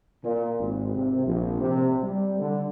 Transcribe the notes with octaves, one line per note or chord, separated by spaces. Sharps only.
A#2
G#1
C3
A#1
C3
G3
D3